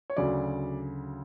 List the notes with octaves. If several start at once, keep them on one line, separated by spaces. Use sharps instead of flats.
C#5
D2 C#3 F#3 D5